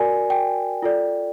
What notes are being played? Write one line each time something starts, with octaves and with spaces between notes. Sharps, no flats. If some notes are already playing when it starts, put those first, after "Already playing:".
Already playing: F#4 A#4 D5 G#5
G5
F4 A4 D5